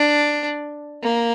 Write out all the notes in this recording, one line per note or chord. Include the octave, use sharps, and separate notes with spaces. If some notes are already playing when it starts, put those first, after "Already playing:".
Already playing: D4
A#3